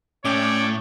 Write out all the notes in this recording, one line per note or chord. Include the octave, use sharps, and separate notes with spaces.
A2 C#4 C#5 D5 G5 D6